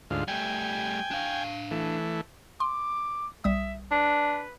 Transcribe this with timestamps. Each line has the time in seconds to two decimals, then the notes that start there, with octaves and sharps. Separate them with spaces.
0.11 D2 G#2 F4
0.28 G3 A3 G5 G#5
1.11 D4 F5
1.71 E3 A3
2.60 C6 D6
3.44 B1 G3 E5 D#6
3.91 D4 B4